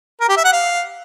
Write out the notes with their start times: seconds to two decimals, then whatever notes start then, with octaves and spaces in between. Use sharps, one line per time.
0.21 A#4
0.29 G4
0.37 E5
0.45 F#5
0.53 F5